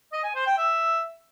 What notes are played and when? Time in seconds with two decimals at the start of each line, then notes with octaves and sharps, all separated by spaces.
0.12 D#5
0.24 G#5
0.35 C5
0.46 G5
0.57 E5